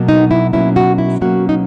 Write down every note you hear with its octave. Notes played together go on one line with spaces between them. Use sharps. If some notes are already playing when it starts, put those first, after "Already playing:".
Already playing: B2 F#3 A#3
D#4
E4
B2 F#3 A#3 C#4 E4
F#4
E4
B2 F#3 A#3 C#4 F#4
D#4